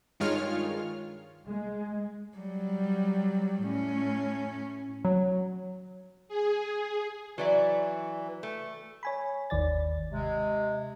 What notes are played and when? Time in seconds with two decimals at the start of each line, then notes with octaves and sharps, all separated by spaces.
0.20 G2 D#3 G#3 F4 C#5 F6
1.46 G#3
2.38 F#3 G3
3.63 A2 C#4
5.05 F#3
6.28 G#4
7.38 E3 F#3 D5 E5
8.43 A3
9.03 C#5 G#5 B5
9.50 G1 D#2 D#3 D5 A6
10.11 C3 G#3